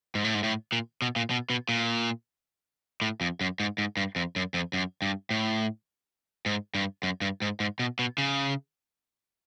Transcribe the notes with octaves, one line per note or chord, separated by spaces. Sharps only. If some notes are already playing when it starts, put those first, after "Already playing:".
G#2
A2
G#2
A2
A#2
B2
A#2
B2
B2
A#2
A2
F2
F#2
G#2
G#2
G2
F2
F#2
F2
F#2
G2
A2
G#2
G2
F#2
G2
G#2
G#2
B2
B2
C#3